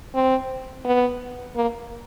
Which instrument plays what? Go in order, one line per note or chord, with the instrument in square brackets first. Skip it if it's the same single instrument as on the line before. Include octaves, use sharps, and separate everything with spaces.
[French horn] C4
B3
A#3